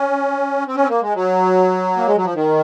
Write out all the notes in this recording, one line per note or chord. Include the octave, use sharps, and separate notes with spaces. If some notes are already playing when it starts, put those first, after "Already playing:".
Already playing: C#4
C4
C#4
C4
A#3
G#3
F#3
A#3
G#3
F#3
F3
D#3